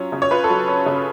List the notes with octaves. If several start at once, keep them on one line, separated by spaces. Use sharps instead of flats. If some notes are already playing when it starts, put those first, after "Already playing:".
Already playing: F#3 C#4 F4 C#5
C#3
C#5
F4 B4
A4
F#3
C#4
C#3